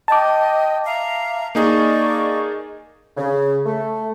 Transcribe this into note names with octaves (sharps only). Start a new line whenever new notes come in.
D#5 G5 A5 D6
E5 F5 A#5
A#3 D#4 G#4 D5 D#5 C#6
C#3
A3